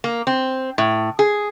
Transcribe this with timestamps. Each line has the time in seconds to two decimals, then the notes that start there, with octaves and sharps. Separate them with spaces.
0.04 A#3
0.27 C4
0.78 A2
1.19 G#4